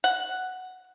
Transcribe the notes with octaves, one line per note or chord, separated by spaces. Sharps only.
F#5